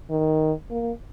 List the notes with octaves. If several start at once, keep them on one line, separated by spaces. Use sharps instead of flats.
D#3
A#3